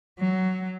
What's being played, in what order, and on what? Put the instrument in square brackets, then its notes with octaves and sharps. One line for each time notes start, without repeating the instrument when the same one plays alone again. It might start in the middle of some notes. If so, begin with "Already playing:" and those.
[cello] F#3